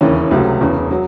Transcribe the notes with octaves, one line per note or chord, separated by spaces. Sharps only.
E1 D#2 C#3 E3 C#4
C#2 C3 F#3 A3
E1 E2 C#3
F#3